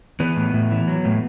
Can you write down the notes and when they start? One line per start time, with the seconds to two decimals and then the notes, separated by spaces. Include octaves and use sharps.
0.20 E3 B3
0.36 A2
0.54 A2
0.71 E3
0.88 F#3
1.05 A2